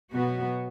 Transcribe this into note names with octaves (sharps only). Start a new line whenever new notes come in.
B2 F#3 B3 F#4